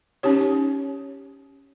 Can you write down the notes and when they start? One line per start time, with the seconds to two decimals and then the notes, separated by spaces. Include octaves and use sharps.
0.23 C#4 D#4 G4 C#5